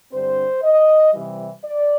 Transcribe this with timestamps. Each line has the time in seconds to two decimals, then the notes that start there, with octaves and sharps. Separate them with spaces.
0.11 G2 D3 G3 C4 C5
0.63 D#5
1.13 C3 E3 G3
1.64 D5